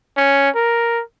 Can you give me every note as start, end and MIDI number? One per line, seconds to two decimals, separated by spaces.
0.17 0.49 61
0.55 1.02 70